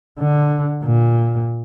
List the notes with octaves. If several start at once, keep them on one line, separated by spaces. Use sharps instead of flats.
D3
A#2